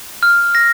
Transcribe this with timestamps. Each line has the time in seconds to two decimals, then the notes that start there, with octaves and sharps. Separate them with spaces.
0.23 F6
0.55 A#6